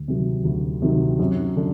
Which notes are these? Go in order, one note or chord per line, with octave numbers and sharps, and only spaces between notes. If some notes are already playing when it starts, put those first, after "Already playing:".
Already playing: D2
C3 D#3 F#3
D2
C3 D#3 F#3
F#2
D3